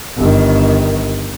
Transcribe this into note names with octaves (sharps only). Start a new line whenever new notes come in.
G1 D#3